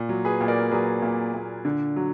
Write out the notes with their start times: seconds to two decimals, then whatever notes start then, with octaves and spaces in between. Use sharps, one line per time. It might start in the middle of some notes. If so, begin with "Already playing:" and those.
Already playing: A#2
0.09 F#3
0.24 G#4 B4
0.41 A#2
0.48 A#4 D5
0.71 F#3 G#4 B4
1.02 A#2
1.34 A#2
1.65 D3
1.96 F#3